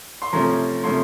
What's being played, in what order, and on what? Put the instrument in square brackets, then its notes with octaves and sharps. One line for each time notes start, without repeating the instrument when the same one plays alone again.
[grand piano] C6
C3 F3 A3 C#4 A#5
C3 F3 A3 C#4 C6